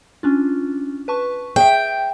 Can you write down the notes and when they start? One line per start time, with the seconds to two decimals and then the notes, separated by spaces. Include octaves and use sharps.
0.23 C#4 D4 F4
1.08 B4 A5 C#6
1.56 G#4 E5 G5